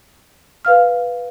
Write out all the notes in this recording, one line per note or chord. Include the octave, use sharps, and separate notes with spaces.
B4 F5 F6